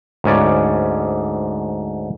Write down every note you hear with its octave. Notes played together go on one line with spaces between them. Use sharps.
D2 G#2 C#4 D5